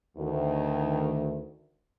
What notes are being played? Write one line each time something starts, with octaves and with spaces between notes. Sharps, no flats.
D2 D#3